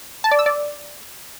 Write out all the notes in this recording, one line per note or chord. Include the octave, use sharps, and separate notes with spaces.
A5
D5
E6
D5